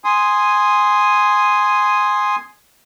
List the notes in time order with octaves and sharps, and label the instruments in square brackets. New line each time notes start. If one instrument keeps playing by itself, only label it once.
[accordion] G#5 C6 D#6